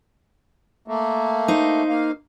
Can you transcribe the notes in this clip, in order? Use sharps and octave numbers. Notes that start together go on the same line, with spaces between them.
A3 A#3
D#4 C5
A#3 F5